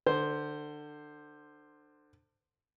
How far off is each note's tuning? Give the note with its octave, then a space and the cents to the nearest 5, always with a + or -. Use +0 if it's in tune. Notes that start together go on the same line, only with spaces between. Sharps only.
D3 +25 C5 +0